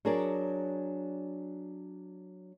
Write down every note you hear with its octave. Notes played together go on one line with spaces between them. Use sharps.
F#3 D4 G#4 A#4 D5